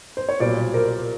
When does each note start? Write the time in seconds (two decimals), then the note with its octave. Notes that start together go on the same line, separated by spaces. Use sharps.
0.17 C5
0.29 C#5
0.39 B1 A#2 G3 C5 D5
0.74 A#4 C5